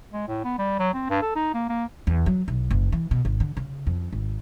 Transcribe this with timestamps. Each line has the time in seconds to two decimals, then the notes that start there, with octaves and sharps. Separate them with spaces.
0.13 G#3
0.28 A2
0.44 B3
0.59 G3
0.79 F#3
0.94 C4
1.10 G2
1.22 A4
1.35 D#4
1.54 A#3
1.69 A#3
2.07 E2
2.26 F#3
2.48 B1
2.71 F#1
2.92 E3
3.11 B2
3.25 G#1
3.40 D3
3.57 C#3
3.87 F2
4.13 G#1